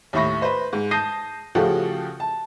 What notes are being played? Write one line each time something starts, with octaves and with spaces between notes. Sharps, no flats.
D#2 A2 E5 B5 C#6 A#6
B4 C5
G#2
A5 D#6 G6 A#6 C7 D#7
C#3 F3 A3 F#4 G4 A4
A5